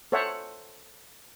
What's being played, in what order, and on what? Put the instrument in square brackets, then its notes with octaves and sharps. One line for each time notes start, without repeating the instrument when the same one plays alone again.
[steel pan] A4 C5 C#5 E5 F#5